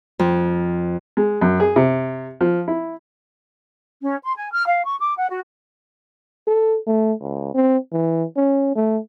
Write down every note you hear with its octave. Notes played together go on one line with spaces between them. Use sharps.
F2
G#3
F#2
G#4
C3
F3
E4
C#4
C6
G#5
F6
F5
C#6
D6
F#5
F#4
A4
A3
C#2
C4
E3
C#4
A3